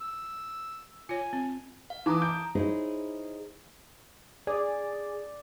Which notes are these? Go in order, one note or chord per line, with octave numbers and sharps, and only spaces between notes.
E6
F4 C#5 G#5
C4
F5
E3 A5 A#5 D6 D#6
G6 D7
D#4 E4 G#4 C5 C#5 D#5
G#4 D5